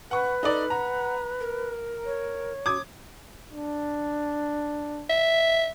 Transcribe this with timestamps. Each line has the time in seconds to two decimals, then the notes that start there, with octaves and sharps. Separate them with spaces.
0.11 B4 F#5 C#6
0.43 D#4 A4 D5
0.70 F#5 A#5
1.40 A#4
2.05 C#5
2.66 F#4 D6 D#6 G#6
3.52 D4
5.10 E5